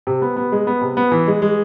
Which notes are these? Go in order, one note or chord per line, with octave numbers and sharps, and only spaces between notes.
C3
B3
B3
G#3
B3
C3
B3
E3
G#3
G#3